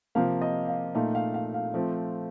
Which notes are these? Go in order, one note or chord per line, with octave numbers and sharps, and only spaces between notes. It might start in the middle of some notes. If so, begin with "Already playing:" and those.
C3 F3 A#3 F5
D#5
F5
A#2 A3 D#4 F5
F5
F5
F5
F3 A3 C4